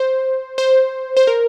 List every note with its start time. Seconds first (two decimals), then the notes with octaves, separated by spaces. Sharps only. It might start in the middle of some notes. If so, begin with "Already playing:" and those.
Already playing: C5
0.58 C5
1.17 C5
1.27 A#4